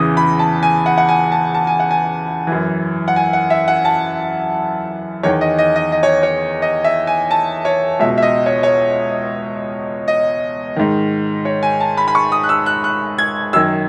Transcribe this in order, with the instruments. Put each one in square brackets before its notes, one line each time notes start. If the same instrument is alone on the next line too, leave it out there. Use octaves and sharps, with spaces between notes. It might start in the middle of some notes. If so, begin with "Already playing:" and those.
Already playing: [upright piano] E2 C#3 E3 D#6
B5
A5
G#5
F#5
F#5
G#5
A5
A5
G#5
F#5
G#5
F#2 E3
F#5
G#5
F#5
E5
F#5
A5
E2 D#3 C#5
D#5
D#5
D#5
D#5
C#5
C#5
D#5
E5
G#5
A5
C#5
C#2 B2 E5
E5
D#5
C#5
C#5
D#5
G#2 D#3
C#5
G#5
A5
B5
B5
C#6
D#6
F#6
E6
F#6
F#6
G#6
F#2 D#3 E6